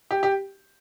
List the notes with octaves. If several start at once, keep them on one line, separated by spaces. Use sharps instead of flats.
G4
G4